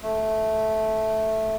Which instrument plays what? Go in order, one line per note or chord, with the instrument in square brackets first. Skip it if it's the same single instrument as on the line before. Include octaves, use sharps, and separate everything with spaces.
[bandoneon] A3